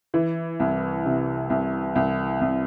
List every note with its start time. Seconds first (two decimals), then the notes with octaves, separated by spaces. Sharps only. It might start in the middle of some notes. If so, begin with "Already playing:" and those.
0.14 E3
0.60 C2
1.05 C3
1.50 C2
1.96 C2
2.41 C2